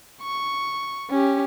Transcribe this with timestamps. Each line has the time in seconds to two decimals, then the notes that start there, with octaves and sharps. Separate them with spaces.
0.22 C#6
1.11 C#4 G4